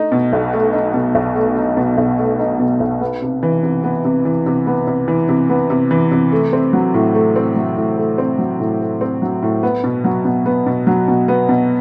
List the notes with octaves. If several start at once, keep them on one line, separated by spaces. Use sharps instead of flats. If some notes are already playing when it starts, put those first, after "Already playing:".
Already playing: A3 D#4
B2
B1
A3
D#4
B2
B1
A3
D#4
B2
B1
A3
D#4
B2
B1
B3
C3
E3
C3
B3
C3
E3
C3
B3
C3
E3
C3
B3
C3
E3
C3
A3
C4
F#3
A2
A3
C4
F#3
A2
A3
C4
F#3
A2
A3
C4
F#3
A2
B3
B2
F#3
B2
B3
B2
F#3
B2
B3
B2